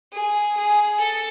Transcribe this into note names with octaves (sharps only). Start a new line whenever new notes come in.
G#4
G#4
A4